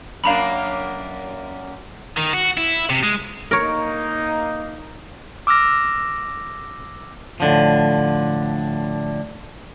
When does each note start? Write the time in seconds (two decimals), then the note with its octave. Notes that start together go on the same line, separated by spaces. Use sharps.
0.24 F#2 A#3 D4 F5 A#5 B5
2.17 D#3
2.34 F#4
2.57 E4
2.90 C3
3.03 G#3
3.51 A#3 D#4 A#4 C#5
5.47 D6 E6 F6 A#6
7.40 A2 D3 F3